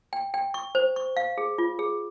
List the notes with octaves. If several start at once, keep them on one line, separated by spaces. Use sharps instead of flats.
G5
G5
C#6
C5
C#6
F5
G#4
F4
G#4